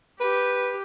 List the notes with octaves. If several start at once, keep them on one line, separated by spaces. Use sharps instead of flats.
G4 B4